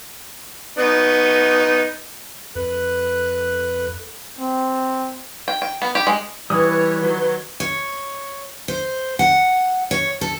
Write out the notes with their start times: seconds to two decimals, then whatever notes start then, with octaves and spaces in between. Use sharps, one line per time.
0.79 B3 D#4
2.55 F2 A4 B4 F#6
4.39 C4
5.48 G5
5.62 G5
5.82 B3
5.95 G4
6.07 G#3
6.50 E3 G3 E4 B4 C#5 D#6
7.00 D#3 F#3
7.60 C#5
8.68 C5
9.19 F#5
9.91 C#5
10.21 A4